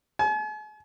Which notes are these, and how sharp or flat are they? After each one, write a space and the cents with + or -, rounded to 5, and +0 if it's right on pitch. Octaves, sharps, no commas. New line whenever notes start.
G#5 +45